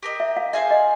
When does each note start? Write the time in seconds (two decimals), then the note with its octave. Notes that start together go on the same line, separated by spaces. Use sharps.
0.03 G4 A#4 D#5
0.20 E5
0.37 F5
0.53 G#4 C5 E5 F5 G#5
0.71 D#5